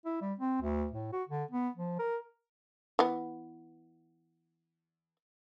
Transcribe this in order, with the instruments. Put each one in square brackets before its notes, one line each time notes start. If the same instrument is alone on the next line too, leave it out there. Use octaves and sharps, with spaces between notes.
[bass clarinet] E4
G3
C4
D2
A2
F#4
D3
B3
F3
A#4
[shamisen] E3 B3